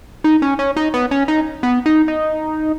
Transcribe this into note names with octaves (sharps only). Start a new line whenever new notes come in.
D#4
C#4
C#4
D#4
B3
C#4
D#4
B3
D#4
D#4